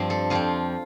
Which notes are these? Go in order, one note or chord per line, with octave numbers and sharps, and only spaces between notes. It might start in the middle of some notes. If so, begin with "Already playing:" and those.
Already playing: G2 F3 C4
A4
F2 F3 C4 F4